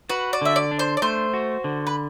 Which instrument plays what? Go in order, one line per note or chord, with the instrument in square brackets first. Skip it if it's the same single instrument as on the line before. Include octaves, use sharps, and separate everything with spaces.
[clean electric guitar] F#4 [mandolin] B4
[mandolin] D5
[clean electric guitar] D3 [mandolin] E5
[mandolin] D5
[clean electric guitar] D4
[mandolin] C5
D5
[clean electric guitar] A3 [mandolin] C5
[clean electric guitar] F#4
D3
[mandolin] B4